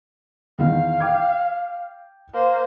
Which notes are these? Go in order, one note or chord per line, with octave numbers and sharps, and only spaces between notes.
E2 D#3 F5
G5 D6 G#6
A#3 C5